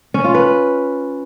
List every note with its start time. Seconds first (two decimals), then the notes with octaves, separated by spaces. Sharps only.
0.14 C#4
0.24 F4
0.35 B4